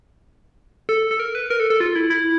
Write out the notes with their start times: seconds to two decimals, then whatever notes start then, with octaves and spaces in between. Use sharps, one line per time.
0.89 A4
1.11 A4
1.20 A#4
1.35 B4
1.50 A#4
1.60 A4
1.70 A4
1.80 F4
1.96 E4
2.10 E4